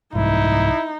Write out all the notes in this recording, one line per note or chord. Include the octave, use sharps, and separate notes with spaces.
C2 G#2 D#4 E4